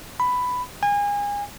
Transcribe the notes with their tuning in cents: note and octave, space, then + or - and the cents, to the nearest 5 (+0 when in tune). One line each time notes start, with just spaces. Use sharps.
B5 +10
G#5 -30